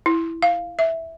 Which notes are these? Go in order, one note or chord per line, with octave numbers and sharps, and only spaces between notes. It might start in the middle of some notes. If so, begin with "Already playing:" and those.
E4
F5
E5